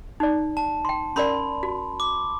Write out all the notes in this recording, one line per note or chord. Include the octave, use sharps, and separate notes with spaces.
D#4 D5
A5
G5 C6
C#4 A#4 D5 B5 C6
F#4
D6